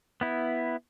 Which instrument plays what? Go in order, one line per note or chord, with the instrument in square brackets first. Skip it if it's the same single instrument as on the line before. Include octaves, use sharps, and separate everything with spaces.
[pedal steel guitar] B3 E4